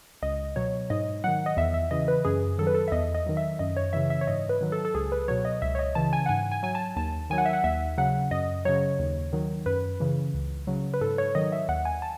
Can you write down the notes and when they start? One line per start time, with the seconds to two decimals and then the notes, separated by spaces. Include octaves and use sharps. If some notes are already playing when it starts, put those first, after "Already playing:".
0.22 C#2 D#5
0.56 B2 F#3 C#5
0.90 G#2 D#5
1.24 D#3 F#3 F#5
1.46 D#5
1.57 E2 E5
1.74 E5
1.91 C#3 E3 D#5
2.08 B4
2.25 F#2 G#4
2.58 D#3 F#3 A4
2.67 B4
2.75 A4
2.88 E5
2.92 E2 D#5
3.15 D#5
3.26 D#3 F#3
3.37 E5
3.59 F#2 D#5
3.77 C#5
3.93 C#3 E3 E5
4.10 E5
4.21 C#5
4.27 G#2 D#5
4.49 B4
4.61 D#3 F#3
4.72 A4
4.85 A4
4.95 C#2 G#4
5.12 B4
5.28 B2 F#3 C#5
5.45 D#5
5.62 C#2 E5
5.75 C#5
5.79 D#5
5.95 C#3 E3 A5
6.13 G#5
6.26 F#5
6.29 G#2 G#5
6.51 G#5
6.63 F#3 G#5
6.75 A5
6.96 D#2 A5
7.30 D#3 F#3 G#5
7.38 F#5
7.46 E5
7.53 F#5
7.64 D#2 E5
7.98 C#3 F#3 F#5
8.31 F#2 D#5
8.65 C#3 F#3 C#5
8.99 D#2
9.33 D#3 F#3
9.66 F#2 B4
10.00 C#3 E3
10.34 C#2
10.67 C#3 F#3
10.94 B4
11.01 G#2 A4
11.18 C#5
11.35 D#3 F#3 D#5
11.52 E5
11.68 D#2 F#5
11.85 G#5
12.02 A5